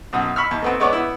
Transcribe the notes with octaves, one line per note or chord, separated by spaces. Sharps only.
B1 F#2 D#6
B5 C#6 E6 F6
D#2
A3 B3 C4
G#3 B3 C#5 D5
B3 E4